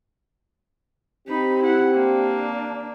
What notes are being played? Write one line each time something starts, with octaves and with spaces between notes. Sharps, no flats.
C4 D#4 G4 B5
E4 F#5
A#3 D4